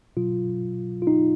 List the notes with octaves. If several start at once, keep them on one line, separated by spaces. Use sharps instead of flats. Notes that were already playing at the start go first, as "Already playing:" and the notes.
B2 F#3 F4
F4
D#4